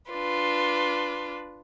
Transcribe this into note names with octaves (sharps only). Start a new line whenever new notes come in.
D4 F4 B4